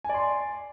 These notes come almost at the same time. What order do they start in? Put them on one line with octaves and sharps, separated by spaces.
G#5 D5 C6